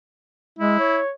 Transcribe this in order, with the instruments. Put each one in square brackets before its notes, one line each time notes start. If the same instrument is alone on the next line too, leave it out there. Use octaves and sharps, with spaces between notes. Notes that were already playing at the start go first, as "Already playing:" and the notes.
[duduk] G#3 [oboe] E4
[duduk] C#5